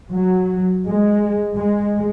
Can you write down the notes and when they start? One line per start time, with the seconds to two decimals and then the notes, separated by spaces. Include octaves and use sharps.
0.12 F#3
0.88 G#3
1.57 G#3